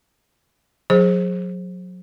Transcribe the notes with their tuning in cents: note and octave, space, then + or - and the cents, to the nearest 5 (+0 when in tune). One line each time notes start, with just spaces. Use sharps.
F#3 -25 G#4 -5 C5 +20